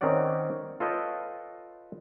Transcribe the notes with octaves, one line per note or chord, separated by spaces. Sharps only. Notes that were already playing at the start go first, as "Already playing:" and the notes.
D#3 C4 C#4 C#5 D5 F#5
F4 A4 B4 C#5 D#5 G5